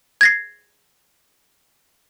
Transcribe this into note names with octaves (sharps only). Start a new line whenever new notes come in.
G#6 A#6 C7